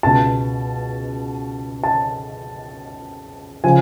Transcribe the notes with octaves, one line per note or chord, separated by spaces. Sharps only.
C#2 B2 A5
A5
C#3 F3 G#5